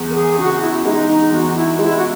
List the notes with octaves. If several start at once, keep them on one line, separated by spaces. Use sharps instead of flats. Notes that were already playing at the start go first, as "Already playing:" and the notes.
Already playing: E2 G#3
A#4
G#4
C#3 F#4
E4
E4
G#3 D#4
D#4
E2 F#4
E4
G#3 E4
F#4